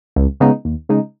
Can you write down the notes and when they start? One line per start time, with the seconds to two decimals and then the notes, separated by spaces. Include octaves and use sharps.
0.16 C#2
0.40 C#3 G#3 B3 D#4
0.65 D#2
0.89 C#3 G#3 D#4